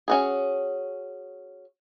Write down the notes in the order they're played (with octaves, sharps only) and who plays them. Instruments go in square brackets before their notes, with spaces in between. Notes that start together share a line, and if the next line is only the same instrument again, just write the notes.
[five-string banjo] C#4 F#4 G#4